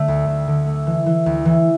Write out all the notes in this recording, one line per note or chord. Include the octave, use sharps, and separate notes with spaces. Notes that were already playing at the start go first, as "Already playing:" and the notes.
Already playing: D3 A3
D2
D2
D3
A3
E3
E3
D2
E3